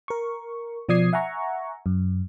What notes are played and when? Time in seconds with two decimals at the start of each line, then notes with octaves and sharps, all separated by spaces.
0.08 A#4 C#6
0.89 B2 F3 D5 D#6 G#6 C7
1.13 E5 F#5 G#5 A#5 C#6
1.86 F#2